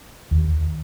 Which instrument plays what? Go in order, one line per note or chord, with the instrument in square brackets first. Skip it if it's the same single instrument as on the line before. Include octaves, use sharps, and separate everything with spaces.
[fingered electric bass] D#2